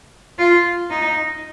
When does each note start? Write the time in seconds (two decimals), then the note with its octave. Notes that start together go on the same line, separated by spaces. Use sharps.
0.38 F4
0.90 D#4